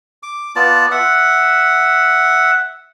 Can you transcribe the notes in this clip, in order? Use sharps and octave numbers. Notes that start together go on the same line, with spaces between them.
D6
B3 F4 D5 A5
E5 F#5